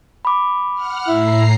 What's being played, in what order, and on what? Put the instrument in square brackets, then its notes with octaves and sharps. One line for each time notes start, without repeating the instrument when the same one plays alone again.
[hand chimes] B5 D6
[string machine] F#5 F6
[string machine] A2 A#5 C7 [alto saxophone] E4